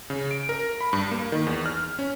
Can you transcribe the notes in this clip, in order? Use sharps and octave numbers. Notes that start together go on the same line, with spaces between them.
C#3
D7
A#4
B5
G2
A#3
D#3
E2
F6
C#4